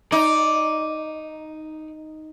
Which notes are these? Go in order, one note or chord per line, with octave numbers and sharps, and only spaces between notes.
D#4 D5